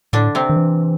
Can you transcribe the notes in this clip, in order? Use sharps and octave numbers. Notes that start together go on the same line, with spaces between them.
A2 D3 D4
C3 C4
D#3
E3